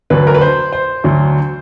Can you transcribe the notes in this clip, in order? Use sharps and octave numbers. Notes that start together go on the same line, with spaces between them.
D2 D3 F#3 B4
A#4
B4
C5
C5
D2 D3 F#3